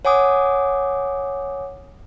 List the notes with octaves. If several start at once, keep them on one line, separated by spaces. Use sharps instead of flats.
C#5 F#5 G#5 D6 D#6